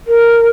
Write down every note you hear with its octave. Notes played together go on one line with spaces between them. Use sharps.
A#4